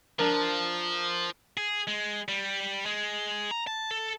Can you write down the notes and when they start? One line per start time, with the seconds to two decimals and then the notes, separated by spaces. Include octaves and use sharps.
0.19 F3 D4 A#4
1.57 G#4
1.87 G#3
2.28 G3
2.86 G#3
3.51 A#5
3.67 A5
3.91 A4